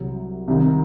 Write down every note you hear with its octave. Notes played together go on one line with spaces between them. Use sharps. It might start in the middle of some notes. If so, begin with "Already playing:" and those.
Already playing: C2 C3 F#3
C2 C3 D#3